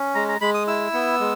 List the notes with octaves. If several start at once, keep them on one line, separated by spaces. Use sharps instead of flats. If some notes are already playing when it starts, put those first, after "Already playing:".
Already playing: C#4
G#3 A#5
A#5
G#3 B5
D#6
E4 E6
B3
G#3